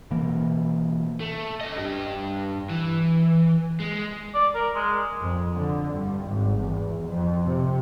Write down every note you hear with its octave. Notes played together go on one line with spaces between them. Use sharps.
B2 E3 A#3
A3
C#4 D#5
G2 G4
E3
G#3
D5
A#4
G#3
F2
D3
G2
G#1
E2
F2
C3